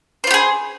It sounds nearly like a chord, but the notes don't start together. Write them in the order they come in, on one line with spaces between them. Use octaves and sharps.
C5 F4 G4 G#4